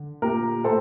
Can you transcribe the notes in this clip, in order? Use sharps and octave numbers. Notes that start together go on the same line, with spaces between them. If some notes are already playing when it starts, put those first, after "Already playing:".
Already playing: D3
A#2 G4 A#4
A2 A4 C5